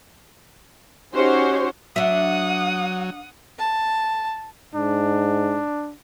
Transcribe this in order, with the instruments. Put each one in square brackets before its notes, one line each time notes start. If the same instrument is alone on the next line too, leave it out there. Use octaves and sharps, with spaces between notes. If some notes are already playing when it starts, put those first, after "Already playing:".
[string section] C#4 D#4 F#4 G4 C5 C#5
[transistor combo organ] F#3 [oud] D4 E5 [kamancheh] F#5 D#6
[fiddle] A5
[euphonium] G#2 [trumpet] D4